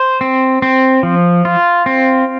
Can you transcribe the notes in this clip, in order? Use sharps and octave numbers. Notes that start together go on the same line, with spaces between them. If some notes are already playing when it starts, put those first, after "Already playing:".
Already playing: C5
C4
C4
F3
F4
C4